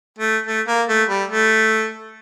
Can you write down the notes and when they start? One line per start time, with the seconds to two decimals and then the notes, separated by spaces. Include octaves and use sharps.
0.19 A3
0.46 A3
0.68 A#3
0.89 A3
1.09 G3
1.30 A3